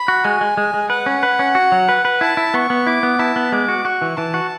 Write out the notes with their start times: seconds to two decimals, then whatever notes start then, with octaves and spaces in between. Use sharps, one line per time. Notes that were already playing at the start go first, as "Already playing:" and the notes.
Already playing: B5
0.08 F#4
0.24 G#3 G#5
0.41 G#3
0.57 G#3
0.74 G#3
0.90 B4 F#5
1.06 C#4
1.23 B4
1.39 C#4
1.55 F#4
1.72 F#3
1.89 B4
2.05 B4
2.20 E4 A5
2.37 E4
2.54 B3 C#6
2.70 B3
2.87 E4 D6
3.03 B3
3.19 E4 A5
3.36 B3
3.52 G#3 D6
3.69 F#4
3.85 F#4 C#6
4.02 E3
4.17 E3 A5
4.34 F#4